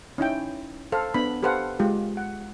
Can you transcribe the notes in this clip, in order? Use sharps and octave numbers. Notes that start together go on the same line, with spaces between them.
C#4 D#4 E4 G5
A4 C5 F5
B3 D4 B5
G4 A4 B4 C5 F5 F#5
G#3 F4 G4
F#5